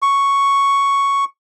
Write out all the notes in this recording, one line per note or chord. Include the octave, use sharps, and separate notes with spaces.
C#6